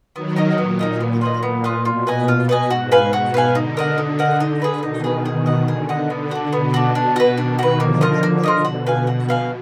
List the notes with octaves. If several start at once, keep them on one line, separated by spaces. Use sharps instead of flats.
D#3 F#3 B3
D#4 A#4 D#5
A#2 B3
D#4 A#4 D#5
B3
F4 B4 D#5
A#2 B3
F4 B4 D#5
B2 F4
B4 D#5 G#5
F4
B4 D#5 G#5
G#2 F#4
B4 F5 G#5
B2 F#4
B4 F5 G#5
D3 D#4
A#4 D#5 F#5
D#4
A#4 D#5 F#5
D#4
G#4 B4
B2 D#3 D#4
G#4 B4
B2 D#3 G#4
D#5 F#5
D3 G#4
D#5 F#5
D3 B3
D4 F#4
B2 B3
D4 F#4
B2 D4
F#4 B4
B2 D#3 D4
F#4 B4
D3 F3 A#3
F4 A#4 D#5
D3 A#3
F4 A#4 D#5
B2 F#4
B4 F5 G#5
F#4
B4 F5 G#5